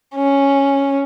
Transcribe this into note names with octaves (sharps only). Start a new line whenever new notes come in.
C#4